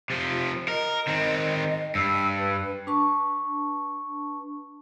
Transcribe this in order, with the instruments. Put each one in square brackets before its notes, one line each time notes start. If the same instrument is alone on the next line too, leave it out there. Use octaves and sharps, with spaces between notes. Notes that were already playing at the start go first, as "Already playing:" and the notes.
[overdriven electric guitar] C3 F3
[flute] F4
[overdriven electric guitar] A#4 [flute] D#5
[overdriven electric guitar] D#3 C4
[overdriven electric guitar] G2 [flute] E6
[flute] B4
[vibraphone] D4 B4 A5 C#6